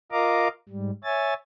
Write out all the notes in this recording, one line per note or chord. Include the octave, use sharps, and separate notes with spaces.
F4 A#4 D#5 F5 A#5 D6
G#2 G3
C#5 E5 G#5 A6